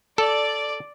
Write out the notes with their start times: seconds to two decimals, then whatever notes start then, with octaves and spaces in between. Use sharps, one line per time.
0.18 A4 D5